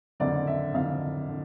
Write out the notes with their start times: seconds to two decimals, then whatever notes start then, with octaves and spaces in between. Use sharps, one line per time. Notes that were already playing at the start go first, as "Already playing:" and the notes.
0.20 F#1 F2 D3 D5
0.47 E5
0.74 F#1 F2 D3 F5
1.29 D3